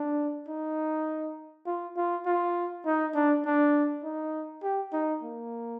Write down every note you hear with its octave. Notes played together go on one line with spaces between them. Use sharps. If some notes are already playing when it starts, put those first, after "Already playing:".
Already playing: D4
D#4
F4
F4
F4
D#4
D4
D4
D#4
G4
D#4
A#3